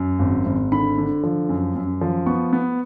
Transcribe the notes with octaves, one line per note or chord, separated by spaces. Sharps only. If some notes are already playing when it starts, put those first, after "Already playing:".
Already playing: F#2
G#1
G#1
D3 B5
D3
F3
F#2
F#2
F3
B3 C#6
B3